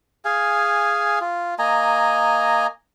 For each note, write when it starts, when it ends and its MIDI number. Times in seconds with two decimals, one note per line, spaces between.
0.25 1.19 68
0.25 1.19 77
0.25 1.19 80
1.21 1.54 65
1.59 2.67 58
1.59 2.67 75
1.59 2.67 80
1.59 2.67 82